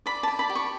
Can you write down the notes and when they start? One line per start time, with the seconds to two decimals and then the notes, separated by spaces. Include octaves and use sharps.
0.06 D5 B5
0.23 A5
0.28 D5
0.39 B5
0.50 G4
0.55 C#6